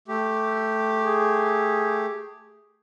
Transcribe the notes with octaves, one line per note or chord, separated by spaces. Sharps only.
A3 G4
G#4